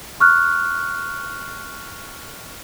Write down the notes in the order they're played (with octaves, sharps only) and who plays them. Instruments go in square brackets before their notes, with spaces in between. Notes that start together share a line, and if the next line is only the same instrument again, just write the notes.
[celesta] C#6 F6 F#6